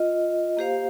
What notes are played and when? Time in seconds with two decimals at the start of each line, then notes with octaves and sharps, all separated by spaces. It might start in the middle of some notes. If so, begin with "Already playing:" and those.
Already playing: F4 D#5
0.57 A#3 G4 C5 F5